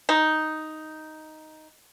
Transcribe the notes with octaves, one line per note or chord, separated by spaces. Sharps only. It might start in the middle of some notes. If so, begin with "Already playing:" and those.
D#4